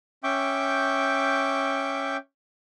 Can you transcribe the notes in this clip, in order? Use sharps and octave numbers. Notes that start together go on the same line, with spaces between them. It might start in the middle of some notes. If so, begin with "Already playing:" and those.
C#4 E5 G5 C#6 D6 G6